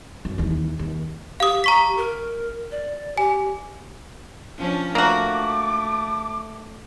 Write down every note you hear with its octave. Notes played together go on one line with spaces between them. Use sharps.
F#2
D#2 E3
D#2
G4 F5 D#6
A#5 C#6 B6
A#4
D5
G4 G#5
F3 C#4 D4
A3 A#3 F#4 D6